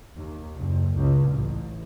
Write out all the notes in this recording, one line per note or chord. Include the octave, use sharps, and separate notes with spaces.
D#2
F#1
C#2
A1